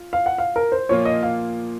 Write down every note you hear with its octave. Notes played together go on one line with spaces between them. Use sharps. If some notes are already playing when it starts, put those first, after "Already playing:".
Already playing: F4
F5
F#5
F5
A#4
C5
A#2 F3 A#3 F4 C#5
D#5
F5